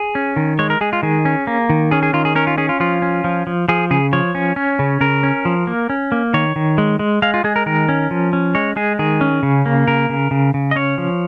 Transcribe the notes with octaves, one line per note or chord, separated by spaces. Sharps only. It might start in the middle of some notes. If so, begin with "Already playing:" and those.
Already playing: G#4
C#4
D#3
G#3 C#5
A#4
G#3 G#4
F4
D#3 G#4
C#4
A#3
D#3
C#4 G#4
G#4
D#3 F4
G#4
C#4 A#4
F4
C#4 G#4
F4
F3 F4
C#4
F3
F3
F3 G#4
C#3 G#4
F3 C#5
C#4
C#4
C#3
C#3 A#4
C#4
F3
A#3
C#4
A#3
D#3 C#5
D#3
G#3
G#3
G#3 F5
F4
G#3 G#4
A#4
D#3 A#4
C#4
F3
C#4
G#3 C#5
G#3 G#4
D#3 G#4
C#4
C#3
A#3
C#3 A#4
C#3
C#3
C#3
D#5
C#4 C#5
F3